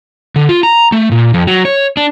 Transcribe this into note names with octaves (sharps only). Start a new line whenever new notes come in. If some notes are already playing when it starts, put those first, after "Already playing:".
D3
F4
A#5
A3
A#2
F2
F#3
C#5
D4